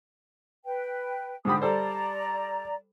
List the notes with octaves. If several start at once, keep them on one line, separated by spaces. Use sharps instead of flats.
B4 G5
G#2 D3 G4 B5 D#6
G3 A4 C5 D5 A#5